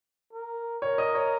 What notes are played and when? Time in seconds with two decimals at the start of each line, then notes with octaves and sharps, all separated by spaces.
0.33 A#4
0.82 A#4 C#5
0.98 D#5
1.15 C#5